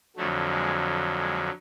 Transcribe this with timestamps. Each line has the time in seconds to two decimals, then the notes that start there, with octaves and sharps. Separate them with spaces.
0.17 F2 D3 F#3 A3
0.51 G#3
1.18 G#3